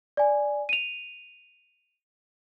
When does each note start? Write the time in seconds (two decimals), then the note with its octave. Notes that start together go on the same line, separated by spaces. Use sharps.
0.17 D5 G#5
0.69 D#7 F7